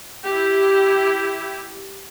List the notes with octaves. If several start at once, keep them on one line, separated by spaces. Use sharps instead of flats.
E4 G4